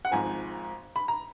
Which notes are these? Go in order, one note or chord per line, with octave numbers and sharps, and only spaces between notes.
F#5
G#1 G#2 F3 G#5
B5
A#5